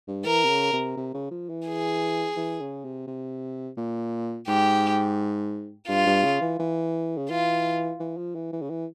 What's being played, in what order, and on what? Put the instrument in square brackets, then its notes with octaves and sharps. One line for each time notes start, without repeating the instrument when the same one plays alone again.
[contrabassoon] G2
[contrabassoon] E3 [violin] A#4
[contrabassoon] C3
C#3
C3
C3
C#3
F3
E3
[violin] G#4
[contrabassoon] E3
C#3
C3
C3
A#2
[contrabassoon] G#2 [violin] G4
[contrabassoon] G2 [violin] F4
[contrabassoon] G2
C#3
E3
E3
C#3
[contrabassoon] E3 [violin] F4
[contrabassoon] E3
F3
E3
E3
C#3
E3